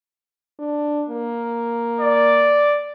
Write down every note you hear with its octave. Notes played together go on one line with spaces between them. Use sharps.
D4
A#3
D5